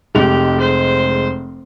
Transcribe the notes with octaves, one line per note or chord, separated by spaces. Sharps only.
F1 G#3 G4 F7
C5